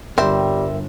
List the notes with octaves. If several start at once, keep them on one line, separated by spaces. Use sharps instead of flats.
G1 G3 C4 A#4 E5